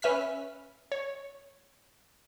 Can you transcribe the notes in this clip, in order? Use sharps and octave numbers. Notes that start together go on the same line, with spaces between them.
C#4 B4 E5 F6 B6
C#5